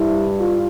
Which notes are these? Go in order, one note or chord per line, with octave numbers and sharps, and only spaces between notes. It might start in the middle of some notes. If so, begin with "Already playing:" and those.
Already playing: G2 G3 E4
F4